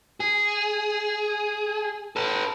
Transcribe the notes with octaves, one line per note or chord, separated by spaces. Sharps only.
G#4
A4 B4